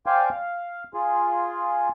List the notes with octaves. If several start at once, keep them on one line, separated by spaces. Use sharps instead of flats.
C5 D5 F5 G5 G#5
F5
F4 G#4